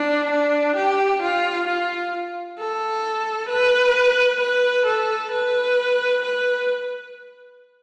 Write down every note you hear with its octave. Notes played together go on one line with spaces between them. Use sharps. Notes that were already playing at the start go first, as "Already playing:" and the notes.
Already playing: D4
D4
G4
F4
F4
A4
B4
B4
A4
B4
B4